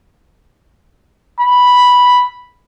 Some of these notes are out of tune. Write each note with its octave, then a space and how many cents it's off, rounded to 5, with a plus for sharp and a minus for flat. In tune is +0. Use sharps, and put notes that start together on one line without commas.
B5 -5